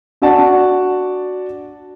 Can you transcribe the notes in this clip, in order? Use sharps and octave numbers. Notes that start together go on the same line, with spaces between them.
D4 F#4 D5 F#5 A5